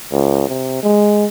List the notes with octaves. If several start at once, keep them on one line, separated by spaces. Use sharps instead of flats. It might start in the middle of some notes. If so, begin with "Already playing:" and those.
C#2
C3
G#3